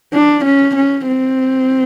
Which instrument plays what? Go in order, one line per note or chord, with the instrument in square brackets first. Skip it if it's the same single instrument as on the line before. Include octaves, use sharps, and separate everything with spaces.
[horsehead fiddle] D4
C#4
C#4
C4